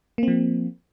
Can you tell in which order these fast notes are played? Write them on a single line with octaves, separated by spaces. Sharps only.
A#3 C4 F3